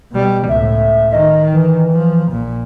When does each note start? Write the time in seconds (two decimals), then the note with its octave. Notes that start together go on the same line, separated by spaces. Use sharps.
0.12 B2 G3
0.49 C#2 A2 E5
1.12 D#3 D#5
1.54 E3
1.92 F3
2.31 A#1 A#2